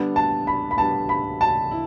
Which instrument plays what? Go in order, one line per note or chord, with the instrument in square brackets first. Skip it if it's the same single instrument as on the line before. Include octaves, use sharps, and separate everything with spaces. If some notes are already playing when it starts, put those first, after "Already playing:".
Already playing: [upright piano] D3 G3 B3 D4
[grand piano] A5
B5
B5
[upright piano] D3 G3 B3 D4 [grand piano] A5
[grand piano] B5
A5
[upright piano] E4